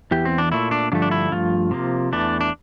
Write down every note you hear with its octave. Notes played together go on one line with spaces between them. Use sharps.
E2 E3 G4
C4
D4
A#2 A3 E4
D4
G2 D3 F3 A3 D4
D4
E4
G2 F3 A3 F4
C3 F3 A#3
E2 E3 A3 D4
D4